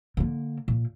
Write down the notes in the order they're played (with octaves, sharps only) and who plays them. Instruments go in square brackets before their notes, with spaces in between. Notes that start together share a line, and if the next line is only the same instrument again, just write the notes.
[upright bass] D3 A#3
A#2